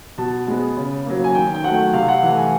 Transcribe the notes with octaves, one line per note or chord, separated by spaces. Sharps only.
B2 A5
G#3 B3
C#3
F#3 A#3
G#5
D#3 G5
G5
F#3 A3 F#5
G5
C3 F5
F#5
E3 A3
G#5